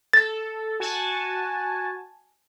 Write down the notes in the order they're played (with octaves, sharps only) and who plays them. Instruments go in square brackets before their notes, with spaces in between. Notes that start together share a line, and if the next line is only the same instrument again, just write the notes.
[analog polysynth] A4 [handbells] A6
[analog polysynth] F#4 G#5 A5